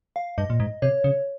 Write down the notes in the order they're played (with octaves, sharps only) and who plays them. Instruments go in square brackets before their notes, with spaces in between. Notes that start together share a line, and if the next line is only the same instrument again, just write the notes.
[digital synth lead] F5
[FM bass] G2 [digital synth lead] D#5
[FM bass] A#2
G#2
[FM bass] C3 [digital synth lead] C#5
[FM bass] C#3